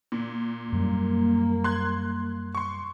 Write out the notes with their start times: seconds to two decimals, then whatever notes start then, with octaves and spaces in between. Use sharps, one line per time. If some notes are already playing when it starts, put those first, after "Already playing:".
0.12 A#2
0.72 F#2 F#3 G3 A#3
1.64 C6 F#6 G#6
2.55 C6 C#6